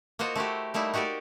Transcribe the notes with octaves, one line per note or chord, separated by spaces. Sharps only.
A#3 F4 F#4 C5 D#5
A3 E4 F#4 G4
G3 A3 A#3 D#4 E4
D#4 F#4 G4 A#4 D5